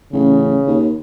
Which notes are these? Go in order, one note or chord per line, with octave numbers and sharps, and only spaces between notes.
A1 C#3
D#2